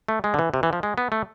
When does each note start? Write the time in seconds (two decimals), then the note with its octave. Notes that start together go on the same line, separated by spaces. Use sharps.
0.09 A3
0.24 G#3
0.34 D3
0.39 E3
0.54 C3
0.63 E3
0.73 F3
0.83 G#3
0.98 B3
1.12 A3